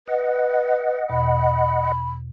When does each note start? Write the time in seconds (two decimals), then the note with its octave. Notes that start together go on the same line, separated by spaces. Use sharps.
0.08 B4 D#5 F#5
1.10 E2 B2 B5